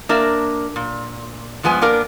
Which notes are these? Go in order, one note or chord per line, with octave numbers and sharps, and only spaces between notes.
A#3 D4 A#4 E5
A#2
G2 F3 G#3 B3 G#5
A#3 B3 D4 A#4